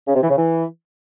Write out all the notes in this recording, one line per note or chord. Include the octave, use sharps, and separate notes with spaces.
C#3
C3
E3
C#3
E3